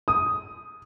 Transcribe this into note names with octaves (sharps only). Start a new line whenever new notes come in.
D#6